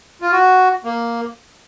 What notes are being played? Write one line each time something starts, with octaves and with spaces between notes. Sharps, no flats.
F4
F#4
A#3